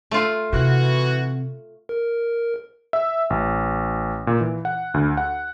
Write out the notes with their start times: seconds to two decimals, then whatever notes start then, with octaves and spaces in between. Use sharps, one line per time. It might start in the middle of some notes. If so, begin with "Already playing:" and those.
0.11 A3 F4
0.53 C3 E3 F#4
1.89 A#4
2.93 E5
3.30 A1
4.27 A#2
4.41 E3
4.65 F#5
4.94 D2
5.17 F#5